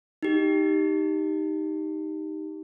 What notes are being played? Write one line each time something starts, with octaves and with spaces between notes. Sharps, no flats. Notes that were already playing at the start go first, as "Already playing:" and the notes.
D#4 G4